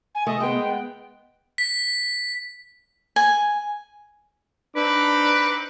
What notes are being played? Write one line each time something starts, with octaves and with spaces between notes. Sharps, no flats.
G#5
A3 D#5
G#3 B3 G5
B6
G#5
C4 D4 D#4 B4 D6